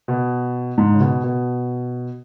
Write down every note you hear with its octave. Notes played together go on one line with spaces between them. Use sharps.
B2
G#2
C#3
B2
B2